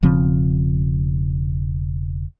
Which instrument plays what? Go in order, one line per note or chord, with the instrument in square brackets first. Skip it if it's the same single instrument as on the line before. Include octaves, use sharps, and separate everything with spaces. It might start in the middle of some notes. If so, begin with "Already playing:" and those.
[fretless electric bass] E1 C#3 F3 C4